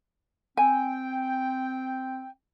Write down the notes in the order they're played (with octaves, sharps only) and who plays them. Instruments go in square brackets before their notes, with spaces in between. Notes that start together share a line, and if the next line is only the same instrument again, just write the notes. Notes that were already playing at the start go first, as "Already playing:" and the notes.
[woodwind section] C4 G5 [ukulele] G#5